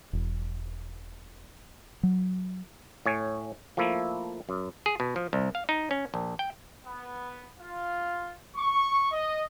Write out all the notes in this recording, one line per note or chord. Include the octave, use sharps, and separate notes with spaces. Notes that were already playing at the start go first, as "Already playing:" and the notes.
E1
F#3
A2 C#5 G#5
F3 A3 A#3 E4
F#2
G#4
B2
F3
C2
F5
D#4
C#4
A#1
G5
B3
F4
C#6
D#5